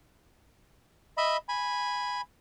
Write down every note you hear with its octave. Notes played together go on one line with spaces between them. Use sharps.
D#5 E5 B5
G#5 B5